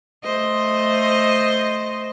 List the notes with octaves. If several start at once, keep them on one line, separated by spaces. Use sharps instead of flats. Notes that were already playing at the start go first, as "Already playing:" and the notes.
A3 C5 D#5